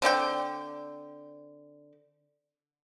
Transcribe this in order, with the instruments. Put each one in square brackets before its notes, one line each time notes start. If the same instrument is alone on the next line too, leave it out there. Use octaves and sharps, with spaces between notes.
[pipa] D3 C4 D5 G5